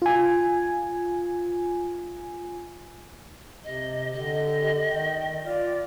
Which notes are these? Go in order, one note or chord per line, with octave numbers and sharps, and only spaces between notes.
F4 G#5
C3 D#5
D3 G4 D#5
D#3 G5
F4 D5